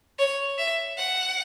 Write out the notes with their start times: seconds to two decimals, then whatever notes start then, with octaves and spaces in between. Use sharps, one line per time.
0.19 C#5
0.58 E5
0.97 F#5